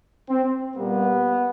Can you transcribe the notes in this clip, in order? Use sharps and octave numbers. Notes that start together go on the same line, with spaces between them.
C4
A#2 G3 A#3 B3